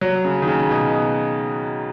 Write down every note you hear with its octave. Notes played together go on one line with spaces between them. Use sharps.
F#3
C#3
D#3
C#3
B2